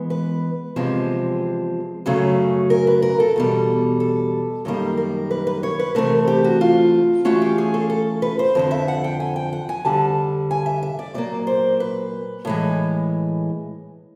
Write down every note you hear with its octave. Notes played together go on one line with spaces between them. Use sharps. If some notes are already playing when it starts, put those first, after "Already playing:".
Already playing: E3 G#3 B3
B4
E2 C3 F3 G#3 C4
F#2 C#3 F#3 A3 C#4
A#4
B4
A#4
A4
E2 B2 G3
A4
F#2 D#3 G3 A#3 A4
A#4
B4
B4
C#5
B4
C3 E3 A3 C4 A#4
G4
F#4
F4
E3 A3 C#4 F4 F#4
G4
G#4
A4
A4
B4
C5
F2 D3 F3
E5
F#5
G5
G#5
G5
F#5
G#5
F2 D3 G3 A5
G#5
E5
E5
D5
A#2 F#3 A#3 D5
C5
B4
A2 E3 G#3